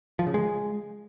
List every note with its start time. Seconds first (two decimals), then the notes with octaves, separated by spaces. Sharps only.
0.19 F3
0.27 C#3
0.34 G#3